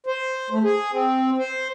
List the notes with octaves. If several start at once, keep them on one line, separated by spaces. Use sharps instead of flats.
C5
A3
G#4
C4
C5